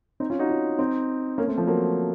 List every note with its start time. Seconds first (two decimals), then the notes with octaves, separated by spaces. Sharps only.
0.20 C4 D#4
0.30 C#4 F4
0.39 D#4 F#4
0.49 C#4 F4
0.79 C4 D#4
1.38 A#3 C#4
1.47 A3 C4
1.58 F3 A3
1.67 F#3 A#3